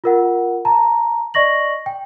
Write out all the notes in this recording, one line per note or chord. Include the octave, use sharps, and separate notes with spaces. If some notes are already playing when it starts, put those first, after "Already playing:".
F4 A#4 F#5
A5 A#5
D5 D#5 C#6 A#6 F#7
G5